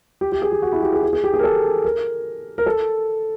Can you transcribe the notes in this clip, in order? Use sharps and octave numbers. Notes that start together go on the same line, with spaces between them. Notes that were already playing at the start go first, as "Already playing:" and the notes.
G4
G4
G#4
G4
F#4
E4
G4
G#4
G#4
G#4
G4
G#4
A#4
A4
A#4
A#4
A4